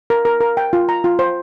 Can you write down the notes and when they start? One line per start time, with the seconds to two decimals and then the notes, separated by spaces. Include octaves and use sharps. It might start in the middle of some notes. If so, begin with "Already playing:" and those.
0.10 A#4
0.25 A#4
0.41 A#4
0.57 G5
0.73 F4
0.89 A#5
1.04 F4
1.19 C5